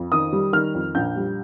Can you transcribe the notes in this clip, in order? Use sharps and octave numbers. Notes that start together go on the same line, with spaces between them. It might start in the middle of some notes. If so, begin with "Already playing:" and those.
Already playing: F2
D#3 D#6
G3
D#3 F6
F2
A#1 G6
G3